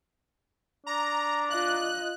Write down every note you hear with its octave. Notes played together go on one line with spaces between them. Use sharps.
D4 A#5
F4 D#5 F#6